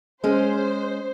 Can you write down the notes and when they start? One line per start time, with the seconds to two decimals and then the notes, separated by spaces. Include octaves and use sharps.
0.24 G#3 C#4 C5